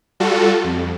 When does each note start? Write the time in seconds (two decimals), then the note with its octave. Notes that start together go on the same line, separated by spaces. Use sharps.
0.20 G3 F4 F#4 A4
0.64 F2